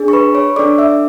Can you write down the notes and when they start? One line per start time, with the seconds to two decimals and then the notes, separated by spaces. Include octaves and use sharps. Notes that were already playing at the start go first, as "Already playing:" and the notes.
Already playing: D4 G#4
0.08 C#6
0.13 B4 B5
0.35 C#5 C#6
0.56 D4 A4 D5 D6
0.78 E5 E6